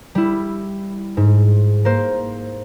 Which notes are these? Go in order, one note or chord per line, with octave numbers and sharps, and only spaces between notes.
G3 E4
G#2
A#3 C5